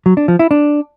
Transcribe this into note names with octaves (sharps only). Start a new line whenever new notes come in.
F#3
D4
F3
E4
D4